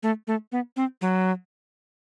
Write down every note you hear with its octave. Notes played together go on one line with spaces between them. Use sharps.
A3
A3
B3
C4
F#3